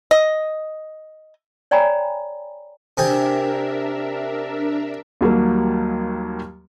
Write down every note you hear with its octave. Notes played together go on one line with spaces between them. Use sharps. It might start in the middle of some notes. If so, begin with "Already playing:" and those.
D#5
C#5 D5 G5 G#5 A#5 B5
C3 D4 G4 G#4 A#4 E5
D#2 F#3 G3 A#3